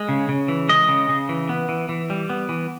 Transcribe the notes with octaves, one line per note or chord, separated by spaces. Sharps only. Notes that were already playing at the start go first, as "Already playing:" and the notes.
Already playing: G#3
C#3
C#3
E3
G#3 D#5
C#3
C#3
E3
B3
E3
E3
G3
B3
E3